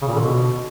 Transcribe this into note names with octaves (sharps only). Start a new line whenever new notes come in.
C#3
A#2
D3
B2